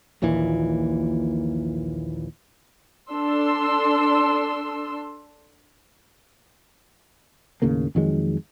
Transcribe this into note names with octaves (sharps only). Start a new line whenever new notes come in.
A#1 D#2 A#2 E3
D4 A4 C6 E6
D#2 A2 C#3 A#3
F2 D#3 F#3 G#3